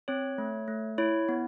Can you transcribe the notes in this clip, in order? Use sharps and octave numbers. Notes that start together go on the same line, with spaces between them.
C4 C#5
A3
A3
E4 C#5
B3